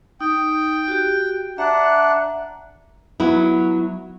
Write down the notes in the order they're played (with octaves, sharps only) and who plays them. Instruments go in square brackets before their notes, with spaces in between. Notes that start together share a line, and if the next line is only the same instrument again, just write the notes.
[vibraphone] D#4 [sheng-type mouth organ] G5
[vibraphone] F#4 G4
[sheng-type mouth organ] D4 F#5 [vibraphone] E5 A#5
[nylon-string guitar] F#3 B3 E4